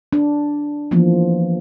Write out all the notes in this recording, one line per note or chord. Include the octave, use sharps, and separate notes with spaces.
D4
E3 F3 A#3 B3